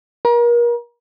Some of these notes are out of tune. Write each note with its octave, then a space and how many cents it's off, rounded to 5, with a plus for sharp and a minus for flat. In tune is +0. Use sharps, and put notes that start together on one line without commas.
A#4 +35